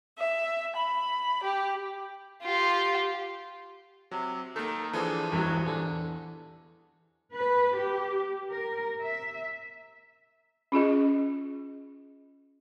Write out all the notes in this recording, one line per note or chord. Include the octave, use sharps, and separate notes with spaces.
E5
B5
G4
F4 G4
C3 F#3
D#3 A#3 A4
D3 E3 F3 G#4
E1 F#3 G3 E4
E2 D3
B4
G4
A#4
E5
C#4 F4 G#4 D#5